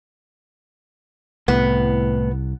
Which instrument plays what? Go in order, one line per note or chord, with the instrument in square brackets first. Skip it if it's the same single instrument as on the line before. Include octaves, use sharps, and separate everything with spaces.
[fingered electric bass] C2 [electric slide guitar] A2 [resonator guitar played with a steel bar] B3